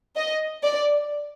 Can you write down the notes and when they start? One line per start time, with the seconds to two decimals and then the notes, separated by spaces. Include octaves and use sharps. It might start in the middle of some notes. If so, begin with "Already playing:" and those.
0.17 D#5
0.63 D5